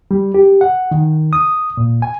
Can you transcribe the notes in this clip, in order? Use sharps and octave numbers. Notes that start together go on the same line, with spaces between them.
G3
G4
F#5
D#3
D#6
A#2
G#5